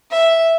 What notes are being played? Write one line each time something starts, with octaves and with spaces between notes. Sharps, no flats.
E5